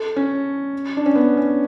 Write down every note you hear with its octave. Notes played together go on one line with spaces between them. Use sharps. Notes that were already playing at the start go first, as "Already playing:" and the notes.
Already playing: A4
C#4
D4
C#4
B3
C#4